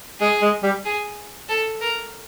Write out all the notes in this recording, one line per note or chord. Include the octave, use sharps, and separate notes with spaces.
G#3 G#4
G#3
G3
G#4
A4
A#4